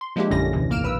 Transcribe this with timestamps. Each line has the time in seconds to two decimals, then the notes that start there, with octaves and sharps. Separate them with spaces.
0.01 C6
0.16 F3 G#3 A#3 D4 E4 G4
0.31 A#1 F#2 D3 C#4 A#6
0.53 D#2 A2 C3 E3
0.69 B1 E2 A#3 F6 D7 E7
0.83 A#1 B4 E6